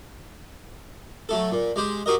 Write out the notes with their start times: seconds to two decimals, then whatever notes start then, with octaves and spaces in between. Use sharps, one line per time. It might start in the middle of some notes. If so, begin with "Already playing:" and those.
1.29 F#3 A3 A4
1.52 A#2
1.76 G#3 G4 C5
2.06 F#4 G4 A#4 D#5